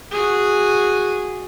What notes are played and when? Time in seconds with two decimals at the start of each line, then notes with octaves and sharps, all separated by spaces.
0.11 F#4 G#4